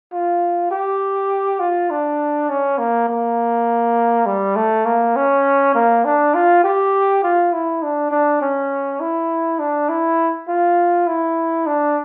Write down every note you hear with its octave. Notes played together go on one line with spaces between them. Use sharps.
F4
G4
F4
D4
C#4
A#3
A#3
G3
A3
A#3
C#4
A#3
D4
F4
G4
F4
E4
D4
D4
C#4
E4
D4
E4
F4
E4
D4